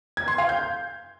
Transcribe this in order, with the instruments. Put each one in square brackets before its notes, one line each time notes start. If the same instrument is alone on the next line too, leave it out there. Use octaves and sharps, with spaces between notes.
[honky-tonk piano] G#6
C6
F5
G6